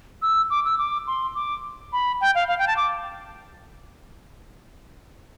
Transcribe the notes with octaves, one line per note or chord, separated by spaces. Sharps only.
E6
D6
E6
D6
C6
D6
B5
G5
F5
F5
G5
A5
D6